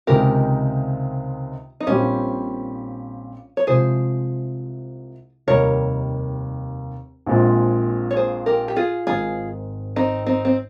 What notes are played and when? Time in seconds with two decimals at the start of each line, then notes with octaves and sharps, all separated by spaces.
0.07 C#2 C3 D#3 G#3 D#4 G4 A#4
1.80 D#4
1.87 A#1 A#2 G3 C4 C#4 G4
3.57 C#5
3.67 C2 C3 F3 G#3 G#4 C5
5.47 F1 D#2 D#3 G3 A#4 C#5
7.27 A#1 A#2 G#3 C4 F4
8.11 C#5
8.16 G#4 C5
8.46 G4 A#4
8.68 G4
8.76 F4 G#4
9.07 G#1 G#2 D#3 G#3 F4 G#4
9.96 C4 D#4
10.27 C4 D#4
10.45 C4